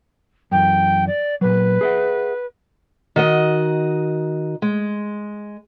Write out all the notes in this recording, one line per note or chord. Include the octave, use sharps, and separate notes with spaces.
F#2 E3 G5
D5
A#2 F#3 B4
G#4 E5 F#5
D#3 F#4 D#5
G#3